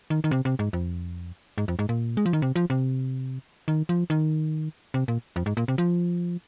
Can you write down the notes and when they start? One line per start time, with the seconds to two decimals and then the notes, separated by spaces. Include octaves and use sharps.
0.10 D#3
0.24 D#3
0.31 C3
0.45 C3
0.59 G#2
0.73 F2
1.58 G#2
1.68 F2
1.79 G#2
1.89 A#2
2.17 G#3
2.26 F3
2.33 D#3
2.42 C3
2.56 F3
2.70 C3
3.68 D#3
3.89 F3
4.10 D#3
4.94 C3
5.08 A#2
5.36 F2
5.46 G#2
5.57 A#2
5.68 C3
5.78 F3